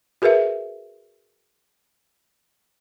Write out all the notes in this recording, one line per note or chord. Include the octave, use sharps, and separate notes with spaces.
F#4 G#4 A#4 B4 E5